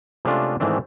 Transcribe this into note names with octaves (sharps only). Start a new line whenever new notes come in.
C3 G#3 A3 C#4 D4 F4
G#2 D#3 E3 A3 C4 D4